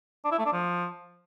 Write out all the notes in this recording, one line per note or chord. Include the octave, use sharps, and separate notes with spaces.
D4
E4
A3
D4
F3